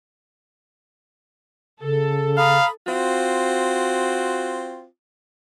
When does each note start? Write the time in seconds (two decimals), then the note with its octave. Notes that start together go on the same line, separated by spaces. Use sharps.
1.81 C#3 A4
2.37 F5 A#5 B5 D#6
2.87 C4 F4 F#4